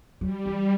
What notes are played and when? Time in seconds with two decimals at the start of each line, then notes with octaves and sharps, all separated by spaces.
0.21 F#3 G3
0.46 E3